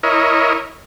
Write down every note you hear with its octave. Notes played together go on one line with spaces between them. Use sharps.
E4 A#4 C#5 D#5